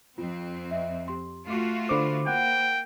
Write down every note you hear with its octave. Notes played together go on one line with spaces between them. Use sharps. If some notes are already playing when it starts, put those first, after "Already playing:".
F2 C4 F4
D#5 E5
G4 C6
A3 F4 F#4 C6 D6 C7
D3 C5 B5 D6
A#3 F#5 G5